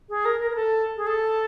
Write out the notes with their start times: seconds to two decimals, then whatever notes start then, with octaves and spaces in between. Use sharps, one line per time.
0.09 G#4
0.25 A#4
0.40 A#4
0.51 A#4
0.55 A4
0.96 G#4
1.06 A4